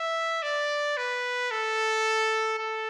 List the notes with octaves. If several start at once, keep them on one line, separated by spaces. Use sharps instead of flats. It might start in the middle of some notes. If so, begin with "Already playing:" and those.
Already playing: E5
D5
B4
A4
A4